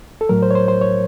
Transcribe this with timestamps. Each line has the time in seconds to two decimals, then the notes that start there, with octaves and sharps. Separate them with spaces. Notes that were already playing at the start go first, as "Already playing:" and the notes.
0.21 A4
0.29 A2 F#3 A#4
0.42 C5
0.51 C#5
0.55 C5
0.68 C5
0.81 C#5